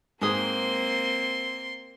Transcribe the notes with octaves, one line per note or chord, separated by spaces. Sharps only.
G#2 A#3 C4 G#4 C6 D#6